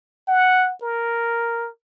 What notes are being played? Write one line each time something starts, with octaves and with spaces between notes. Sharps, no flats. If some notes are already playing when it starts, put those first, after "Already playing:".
F#5
A#4